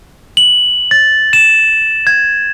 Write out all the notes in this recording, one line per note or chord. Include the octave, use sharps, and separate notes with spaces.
F#7
A6
E7
G#6